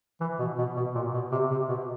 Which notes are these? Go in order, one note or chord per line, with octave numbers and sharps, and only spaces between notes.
E3
B2
B2
B2
A#2
B2
C3
C3
B2